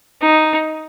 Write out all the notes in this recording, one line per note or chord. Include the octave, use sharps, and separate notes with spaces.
D#4